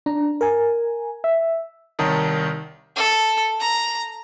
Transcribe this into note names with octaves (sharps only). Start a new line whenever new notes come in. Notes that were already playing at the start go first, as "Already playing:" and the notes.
D4 A#5
A#4 G#5
E5
C2 D#3 C#5 A5 A#5 D#6
A4
A#5